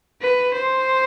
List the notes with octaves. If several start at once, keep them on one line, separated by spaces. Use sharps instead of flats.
B4
C5